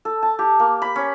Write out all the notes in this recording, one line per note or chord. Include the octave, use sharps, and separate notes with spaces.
A4
A5
G4
A#3
B5
C#4